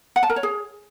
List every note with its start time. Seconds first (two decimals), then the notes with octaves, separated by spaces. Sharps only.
0.16 F#5
0.23 A5
0.30 A#4
0.36 C#5
0.43 G#4